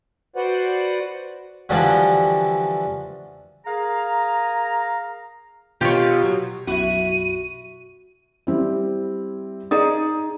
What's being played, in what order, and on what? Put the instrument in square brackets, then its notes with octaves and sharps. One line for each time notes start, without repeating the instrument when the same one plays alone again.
[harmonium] F#4 B4 C5 D5 F#5
[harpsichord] D3 E3 F3 G3 F#4
[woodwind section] G#4 A#4 F5 A#5
[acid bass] B2 [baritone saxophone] F4 [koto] G4 C#5
[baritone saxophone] F#3
[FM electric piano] B1 F#2 [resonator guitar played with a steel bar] E4 E5 [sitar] F#4 [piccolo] D#7
[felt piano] G3 C4 E4
[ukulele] D#4 G#4 D5 [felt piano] D#5 D#6